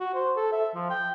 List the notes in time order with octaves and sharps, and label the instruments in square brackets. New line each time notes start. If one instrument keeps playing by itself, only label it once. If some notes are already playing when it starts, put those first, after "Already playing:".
[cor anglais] F#4
C5
A4
E5
F3
G5